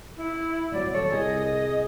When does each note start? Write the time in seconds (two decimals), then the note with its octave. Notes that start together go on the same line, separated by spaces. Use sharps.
0.17 E4
0.72 D1 G1 F#3 D5
0.95 D#1 A4 C#5
1.12 C2 G#4 D#5